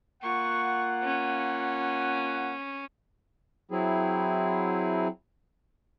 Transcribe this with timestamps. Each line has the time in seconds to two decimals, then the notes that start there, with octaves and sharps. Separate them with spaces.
0.23 A#3 F4 F#5 C#6
1.03 C#4
3.71 F#3 C4 E4 G#4